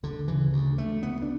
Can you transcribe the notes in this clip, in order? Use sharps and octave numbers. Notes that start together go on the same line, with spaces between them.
D2 D3
C#3 E3
D2
D2 A3
D2 B3
D4